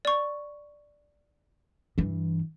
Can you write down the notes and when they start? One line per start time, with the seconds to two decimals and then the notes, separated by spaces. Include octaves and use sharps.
0.05 D5 C#6
1.98 G2 E3